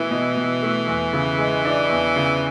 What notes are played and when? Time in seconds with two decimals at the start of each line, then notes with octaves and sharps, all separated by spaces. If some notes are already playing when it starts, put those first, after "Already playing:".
Already playing: B2 E3 A3 E4
0.11 B2
0.36 B2
0.62 A3
0.87 E2
1.13 C#3
1.39 G#3
1.65 D4
1.90 E2
2.16 C#3